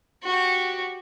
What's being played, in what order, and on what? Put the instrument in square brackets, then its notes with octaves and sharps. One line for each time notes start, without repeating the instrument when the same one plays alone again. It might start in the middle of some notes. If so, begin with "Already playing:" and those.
[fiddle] F#4 G4